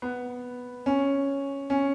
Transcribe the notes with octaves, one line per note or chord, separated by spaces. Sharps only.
B3
C#4
C#4